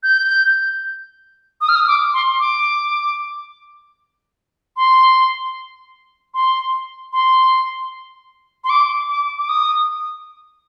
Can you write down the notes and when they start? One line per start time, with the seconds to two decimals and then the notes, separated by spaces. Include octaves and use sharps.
0.03 G6
1.61 D#6
1.69 F6
1.76 D#6
1.87 D6
2.14 C6
2.40 D6
4.77 C6
6.34 C6
7.13 C6
8.64 C6
8.70 D6
9.09 D6
9.39 D6
9.49 D#6